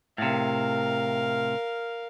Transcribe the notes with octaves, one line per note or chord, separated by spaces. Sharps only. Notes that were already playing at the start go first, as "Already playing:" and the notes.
A2 C3 A#4 F5